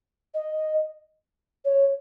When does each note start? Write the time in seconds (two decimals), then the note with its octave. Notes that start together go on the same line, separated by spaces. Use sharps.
0.34 D#5
1.64 C#5